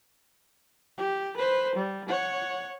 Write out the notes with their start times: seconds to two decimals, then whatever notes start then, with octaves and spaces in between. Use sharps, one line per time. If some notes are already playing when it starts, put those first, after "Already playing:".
0.98 G4
1.37 B4 C5
1.76 G3
2.08 C#5 F#5